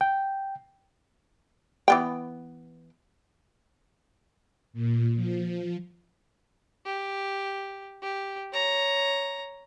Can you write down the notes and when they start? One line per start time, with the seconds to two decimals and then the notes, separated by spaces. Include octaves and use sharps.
0.01 G5
1.88 E3 B3 G5
4.73 A#2
5.16 F3
6.86 G4
8.03 G4
8.53 C#5 A#5